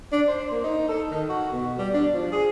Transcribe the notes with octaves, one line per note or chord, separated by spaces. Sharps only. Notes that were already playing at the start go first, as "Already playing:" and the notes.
D4
C5
A#3
D#4
A4
D#3
F#4
B2
G3
D4
F3
G#4